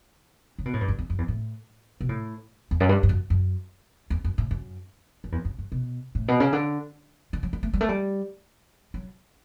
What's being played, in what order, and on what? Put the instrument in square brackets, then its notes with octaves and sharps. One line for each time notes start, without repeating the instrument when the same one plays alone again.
[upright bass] C#3
B2
A2
G2
F#2
E2
F#2
E2
A2
B2
A2
E2
F#2
G2
G2
F#2
F#2
E2
F#2
A2
F#2
F#2
E2
F#2
G2
B2
A2
B2
C#3
D3
D3
F#3
G3
A3
G3
A3
G3
F#3